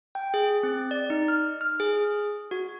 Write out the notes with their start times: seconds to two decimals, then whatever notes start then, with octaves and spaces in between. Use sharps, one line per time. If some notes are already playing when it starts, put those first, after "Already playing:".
0.15 G5
0.34 G#4
0.63 C4
0.91 D5
1.10 D#4
1.28 F6
1.61 F6
1.80 G#4
2.51 F#4